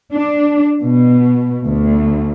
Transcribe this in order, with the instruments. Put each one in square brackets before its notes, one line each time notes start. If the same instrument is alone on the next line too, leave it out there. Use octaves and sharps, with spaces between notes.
[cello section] D4
B2
D2